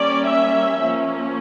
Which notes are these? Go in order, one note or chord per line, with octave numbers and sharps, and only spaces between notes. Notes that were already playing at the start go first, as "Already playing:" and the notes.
Already playing: G3 A#3 C#4 D5
E5
F3 A#3 C#4